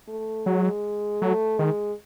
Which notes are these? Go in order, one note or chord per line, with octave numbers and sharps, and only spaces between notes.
A3
F#3 G#3
F#3 A3
D#3 G#3